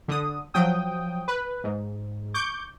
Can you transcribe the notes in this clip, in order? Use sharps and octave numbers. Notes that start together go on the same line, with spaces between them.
D3 D#6
F3 F#3 G5 D#6
B4
G#2
C#6 D6 G6